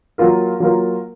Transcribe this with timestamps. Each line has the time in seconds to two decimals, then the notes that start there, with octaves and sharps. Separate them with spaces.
0.18 F#3 A#3 F4 A#4
0.60 F#3 A#3 F4 A#4